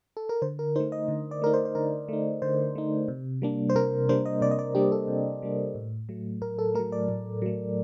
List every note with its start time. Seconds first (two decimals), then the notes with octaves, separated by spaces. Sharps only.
0.17 A4
0.29 A#4
0.42 D3 C5
0.59 A#4
0.76 D#4 C5
0.80 A3
0.92 D#5
1.08 D3
1.31 D5
1.42 A3 D#4 A#4
1.54 C5
1.65 C5
1.75 D3 A#4
2.09 A3 D#4
2.42 D3 C5
2.75 A3 D#4
3.08 C3
3.42 G3 A#3 D4
3.70 C5
3.75 C3 A#4
4.09 G3 A#3 D4 C5
4.26 D#5
4.41 C3 D5
4.51 D#5
4.59 D5
4.75 G3 A#3 D4 G4
4.92 A4
5.08 C3
5.42 G3 A#3 D4
5.75 A2
6.09 F#3 A3
6.42 A2 A#4
6.59 A4
6.75 A3 A#4
6.79 F#3
6.92 D5
7.09 A2
7.42 F#3 A3